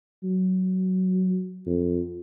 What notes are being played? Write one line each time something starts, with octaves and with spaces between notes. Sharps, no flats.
F#3
F2